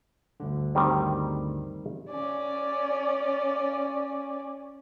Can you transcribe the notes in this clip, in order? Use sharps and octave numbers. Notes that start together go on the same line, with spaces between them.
D2 G2 D3
D#3 G3 C4
C#4 D5